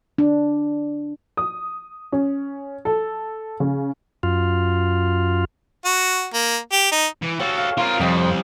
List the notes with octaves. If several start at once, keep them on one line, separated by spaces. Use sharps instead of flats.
D4
D#6
C#4
A4
C#3
F#2 F4
F#4
A#3
G4
D#4
E3
F#4 G4 A4 C#5 F5
F5
C4 F4 A#4
F2 G3 C4 D#5 G5